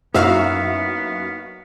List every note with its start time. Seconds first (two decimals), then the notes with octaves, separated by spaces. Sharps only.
0.15 F#2 A#3 B3 D#4 E4 F#4 E5 F5